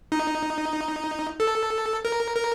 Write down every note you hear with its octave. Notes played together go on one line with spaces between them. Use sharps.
D#4
A4
A#4
A#4